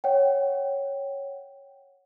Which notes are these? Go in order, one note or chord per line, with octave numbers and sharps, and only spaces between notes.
C#5 F#5 G5